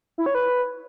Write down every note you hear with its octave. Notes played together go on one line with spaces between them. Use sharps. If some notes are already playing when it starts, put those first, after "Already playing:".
E4
C#5
B4